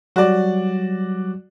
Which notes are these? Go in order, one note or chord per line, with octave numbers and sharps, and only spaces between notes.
F#3 G3 F#4 D5